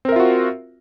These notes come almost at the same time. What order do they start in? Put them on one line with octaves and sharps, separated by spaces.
C4 A#4 E5 F4 F#4